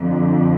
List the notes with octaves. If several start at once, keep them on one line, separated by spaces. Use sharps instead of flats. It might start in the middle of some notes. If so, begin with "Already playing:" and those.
Already playing: F2 D3